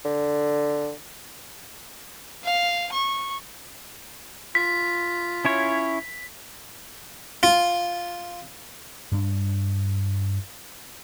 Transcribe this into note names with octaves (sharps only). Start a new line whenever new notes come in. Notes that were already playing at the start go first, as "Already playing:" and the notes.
D3
F5
C#6
F4 B6
C#4 E4 C#5
F4
G2 D4